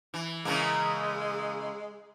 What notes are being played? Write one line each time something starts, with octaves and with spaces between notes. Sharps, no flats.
E3
C#3 E3 G#3 A#3